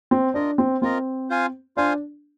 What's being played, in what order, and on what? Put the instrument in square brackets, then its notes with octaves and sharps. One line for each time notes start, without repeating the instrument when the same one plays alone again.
[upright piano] C4
[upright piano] D4 [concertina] F4 A#4 D#5
[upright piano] C4
[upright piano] C4 [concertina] F4 A#4 D#5
[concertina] F4 C5 F5 G#5
[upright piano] D4 [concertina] F4 C5 F5 G#5